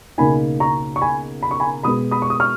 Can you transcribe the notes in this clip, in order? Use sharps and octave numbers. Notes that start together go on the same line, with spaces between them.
C#2 B2 A#3 D#4 G#5 B5
A#5 C#6
C#6
G#5 B5
B5
C#6
G#5 B5
B2 G#3 B3 B5 D#6
B5 D#6
C#6
D#6
C#6 F6